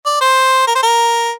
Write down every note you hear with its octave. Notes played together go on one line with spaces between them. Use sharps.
D5
C5
A#4
C5
A#4